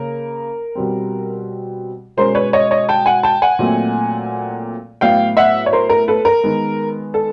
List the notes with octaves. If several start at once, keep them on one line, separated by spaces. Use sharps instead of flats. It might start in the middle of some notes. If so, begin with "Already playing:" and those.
Already playing: C#3 A#3 A#4
B2 G3 C4
B2 G#3 C#4 A#4 C5
B4 C#5
C#5 D#5
C#5 D#5
G5 A5
F#5 G#5
G5 A5
F#5 G#5
A#2 F#3 A3 C4
A2 F#3 B3 F5 G5
E5 F#5
C#5
A#4 C5
A#4
A4 B4
A#4
D#3 G#3 B3
A4